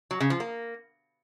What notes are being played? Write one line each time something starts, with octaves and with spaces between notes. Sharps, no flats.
F#3
C#3
F3
A#3